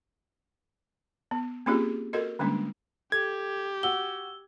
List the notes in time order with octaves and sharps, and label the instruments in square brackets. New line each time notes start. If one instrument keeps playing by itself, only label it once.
[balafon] B3
A#3 C4 C#4 F4 G4 G#4
F#4 A4 A#4 D#5
D3 G3 G#3 A#3 C#4 D4
[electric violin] G4 [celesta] A4 [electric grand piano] G#6
[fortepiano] F#4 [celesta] E6 G7